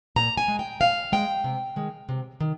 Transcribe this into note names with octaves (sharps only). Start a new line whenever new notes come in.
A#2 A#5
G#5
G#3
G5
A#2 F5
G#3 G5
C3
D#3 G#3
C3
D#3